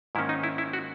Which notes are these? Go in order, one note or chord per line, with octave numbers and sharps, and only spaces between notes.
G#2 D#3 A#3 C#4 E4
D#4
E4
E4
F#4